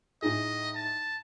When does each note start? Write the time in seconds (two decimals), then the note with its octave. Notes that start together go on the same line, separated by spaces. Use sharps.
0.22 A2 D#4 G#4 D#5
0.76 A5